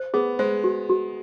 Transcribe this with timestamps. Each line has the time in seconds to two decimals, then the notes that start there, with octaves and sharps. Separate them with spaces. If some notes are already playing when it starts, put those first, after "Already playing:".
Already playing: C5
0.14 B3 G#4
0.39 G#3 C5
0.64 F#4
0.90 F#4